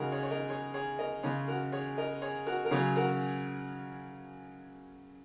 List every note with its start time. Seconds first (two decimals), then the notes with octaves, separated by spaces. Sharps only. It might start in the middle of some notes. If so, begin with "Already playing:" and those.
Already playing: C#3 G#3 D#4 F#4 G#4 A#4
0.12 G#4 C#5
0.23 C#5
0.31 A#4 D#5
0.49 G#4 C#5
0.74 G#4 C#5
0.99 A#4 D#5
1.23 C#3 G#3 G#4 C#5
1.48 F#4 A#4
1.72 G#4 C#5
1.98 A#4 D#5
2.22 G#4 C#5
2.46 F#4 A#4
2.65 A#4
2.71 C#3 F#3 G#4 C#5
2.96 F#4 A#4